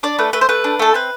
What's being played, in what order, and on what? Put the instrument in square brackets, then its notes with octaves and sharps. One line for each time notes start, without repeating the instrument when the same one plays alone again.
[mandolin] D4 D5
A3 B4
A3 B4
C5
A3 B4
D4
A3 A4
C4 B4